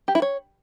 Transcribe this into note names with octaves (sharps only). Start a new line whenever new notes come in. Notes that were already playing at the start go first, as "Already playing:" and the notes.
G4
E4
C#5